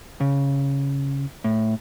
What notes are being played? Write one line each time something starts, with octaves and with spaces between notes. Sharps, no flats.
C#3
A2